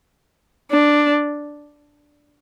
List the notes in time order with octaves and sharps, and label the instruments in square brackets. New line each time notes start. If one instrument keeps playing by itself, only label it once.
[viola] D4